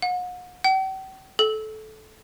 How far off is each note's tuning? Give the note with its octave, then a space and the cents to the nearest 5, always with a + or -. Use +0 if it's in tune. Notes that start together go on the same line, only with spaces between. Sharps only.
F#5 -40
G5 -45
A4 -20